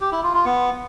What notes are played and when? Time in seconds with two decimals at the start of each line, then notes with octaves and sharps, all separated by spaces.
0.01 G4
0.12 E4
0.23 F4
0.34 F4
0.45 B3